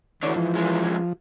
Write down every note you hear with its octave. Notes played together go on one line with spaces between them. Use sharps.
D2 D3 E3 C#5 D5
G#2 F3
C2 G#3